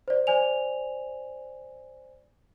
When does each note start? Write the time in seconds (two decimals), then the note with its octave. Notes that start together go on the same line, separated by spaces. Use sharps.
0.08 C5 D5
0.27 C5 D5 G#5 F7